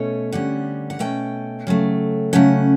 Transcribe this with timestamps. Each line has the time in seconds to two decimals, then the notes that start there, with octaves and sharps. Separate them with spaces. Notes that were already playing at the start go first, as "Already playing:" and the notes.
Already playing: B2 A3 C#4 C#5
0.32 D3 G3 C#4 F#5
0.90 F#5
0.99 B2 A3 C#4 G5
1.67 C#3 F#3 A3
2.33 C#3 F#3 A3 C#4 F#5